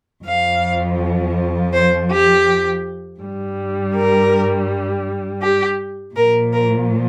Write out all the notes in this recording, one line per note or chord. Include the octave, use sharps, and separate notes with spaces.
F2 F3 F5
C5
G4
G2 G3
A#4
G4
A#2 F3 A#4
A#4